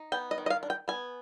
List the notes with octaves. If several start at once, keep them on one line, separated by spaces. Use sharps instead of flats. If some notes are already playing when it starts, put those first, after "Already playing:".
Already playing: D#4
B3 G5
D#5
D#3
D#5
F5
D4
G5
B3 G#5